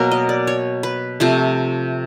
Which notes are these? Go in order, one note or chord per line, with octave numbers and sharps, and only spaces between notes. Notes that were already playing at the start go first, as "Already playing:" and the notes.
Already playing: B2 F#3 A#3 A#4
D#5
D5
C#5
B4
C3 F3 A3